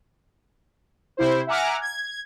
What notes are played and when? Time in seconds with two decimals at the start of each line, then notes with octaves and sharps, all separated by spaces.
1.17 C3 E4 C5
1.47 E5 F#5 G#5 A#5 D6 F6
1.81 G#6